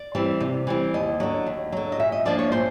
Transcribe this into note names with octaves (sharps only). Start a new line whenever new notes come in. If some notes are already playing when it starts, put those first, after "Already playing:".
Already playing: D5
E3 G3 C4
C3
E3 G3 C4
D#2 D#5
D3 F#3
D#2
D3 F#3
D#5
A#2 E5
D#5
F3 A#3 D4 D5
C#5
A#2 C5